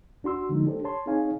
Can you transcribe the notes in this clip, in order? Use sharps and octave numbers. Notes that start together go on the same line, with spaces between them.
D#2 D4 F#4 C6 E6
D3 F3 G#3 A#3 D#4
D4 G4 A4 C5
C#5 A5 C6
C4 D#4 G#4 C#5 F5 G#5